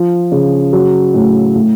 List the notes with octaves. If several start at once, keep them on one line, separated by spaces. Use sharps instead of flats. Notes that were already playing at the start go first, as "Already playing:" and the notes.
Already playing: F3
C#3
F#3
A2
A2